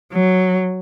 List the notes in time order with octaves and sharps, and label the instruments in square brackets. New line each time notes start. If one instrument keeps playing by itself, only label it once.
[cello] F#3